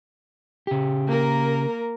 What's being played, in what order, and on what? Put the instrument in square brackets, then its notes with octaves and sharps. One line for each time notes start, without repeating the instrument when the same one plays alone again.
[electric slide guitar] C#3 G4
[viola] A#3 A#4